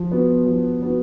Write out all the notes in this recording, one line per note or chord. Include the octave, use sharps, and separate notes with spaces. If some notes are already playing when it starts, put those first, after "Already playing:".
Already playing: F3
B3 F#4
F3
B3 F#4